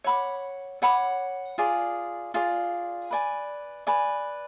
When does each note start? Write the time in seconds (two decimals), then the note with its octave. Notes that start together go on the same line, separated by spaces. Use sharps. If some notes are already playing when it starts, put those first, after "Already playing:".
0.04 C#5 F#5 B5 D6
0.82 C#5 F#5 B5 D6
1.58 F4 G#4 D5
2.34 F4 G#4 D5
3.11 B4 D5 G#5
3.87 B4 D5 G#5